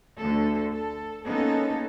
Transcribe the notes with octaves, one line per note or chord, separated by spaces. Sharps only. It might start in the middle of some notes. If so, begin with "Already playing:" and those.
D2 D3 A3 A4
A4
G#3 A#3 B3 C#4 D#4 A4